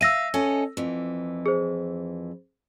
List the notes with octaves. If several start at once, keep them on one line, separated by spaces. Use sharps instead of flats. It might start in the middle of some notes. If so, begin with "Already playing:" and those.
E5 F5 E6 A#6 D#7
C#4 A4 D#5
F2 E3
G#4 C5